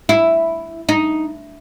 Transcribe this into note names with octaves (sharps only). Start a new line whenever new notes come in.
E4
D#4